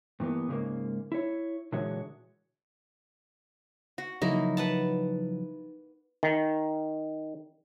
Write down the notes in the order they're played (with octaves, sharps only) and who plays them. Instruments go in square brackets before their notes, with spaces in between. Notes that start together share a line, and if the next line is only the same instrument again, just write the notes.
[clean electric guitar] G2 E3 A#3 B3
G#2 C#3 G3 G#3 A#3
E4 C#5
A#2 D3 E3 G#3 F#4 C#5
[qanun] F#4
[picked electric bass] C#3 F3 F#3 [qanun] A#3 D#4 E4
[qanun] B4 F#5 A5
[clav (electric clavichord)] D#3